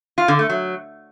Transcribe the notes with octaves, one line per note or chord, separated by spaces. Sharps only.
F4
D3
A3
F#3